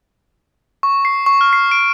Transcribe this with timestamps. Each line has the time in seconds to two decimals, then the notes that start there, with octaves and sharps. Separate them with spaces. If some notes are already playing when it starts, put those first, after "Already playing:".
0.83 C#6
1.05 C7
1.26 C#6
1.41 F6
1.53 C7
1.71 D7